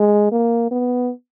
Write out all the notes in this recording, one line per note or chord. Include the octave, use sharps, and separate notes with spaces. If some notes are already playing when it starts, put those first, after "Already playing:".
Already playing: G#3
A#3
B3